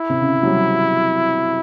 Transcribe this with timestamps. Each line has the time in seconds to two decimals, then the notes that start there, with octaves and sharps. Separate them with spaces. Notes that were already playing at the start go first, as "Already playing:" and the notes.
Already playing: E4
0.10 C3
0.20 C#3
0.34 C#3
0.43 F#3
0.47 G3